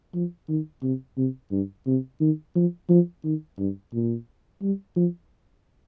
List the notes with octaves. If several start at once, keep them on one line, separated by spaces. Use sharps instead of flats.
F3
D#3
C3
C3
G2
C3
D#3
F3
F3
D#3
G2
A#2
G3
F3